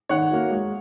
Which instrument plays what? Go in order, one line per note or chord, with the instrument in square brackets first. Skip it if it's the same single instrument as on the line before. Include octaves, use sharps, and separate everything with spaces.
[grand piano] D#3 [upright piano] C#5 F#5
[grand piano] A#3 F#4
G#3